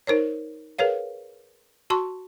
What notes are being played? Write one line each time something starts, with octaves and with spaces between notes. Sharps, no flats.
D#4 A#4 C5 C#5
G#4 A#4 B4 C#5 F5
F#4 A5 C6 C#6